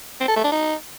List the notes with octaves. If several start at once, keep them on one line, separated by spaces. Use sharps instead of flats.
C4
A4
A3
D4
D#4